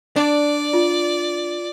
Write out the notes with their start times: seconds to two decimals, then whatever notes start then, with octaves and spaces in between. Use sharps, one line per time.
0.16 D4 D5
0.73 F4